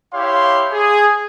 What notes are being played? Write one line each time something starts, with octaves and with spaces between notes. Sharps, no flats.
E4 G4 C#5 F5 C6
G#4